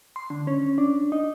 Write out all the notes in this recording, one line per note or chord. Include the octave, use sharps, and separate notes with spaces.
C6
D3
C#4
D4
D#4